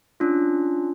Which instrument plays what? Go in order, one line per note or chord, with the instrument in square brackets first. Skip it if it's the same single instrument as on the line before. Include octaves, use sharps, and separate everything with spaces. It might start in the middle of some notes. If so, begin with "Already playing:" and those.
[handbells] C#4 D4 F4